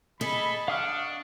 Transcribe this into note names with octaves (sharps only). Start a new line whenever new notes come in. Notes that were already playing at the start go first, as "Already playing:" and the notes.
G#4 A4 D#5 B5
D4 F5 F#5 C#6 D#6 F6